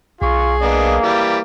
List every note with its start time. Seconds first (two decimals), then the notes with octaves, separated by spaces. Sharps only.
0.22 B1 F4 G#4 C#6
0.61 A#3 B3 D4 D#5
1.03 E3 G3 D6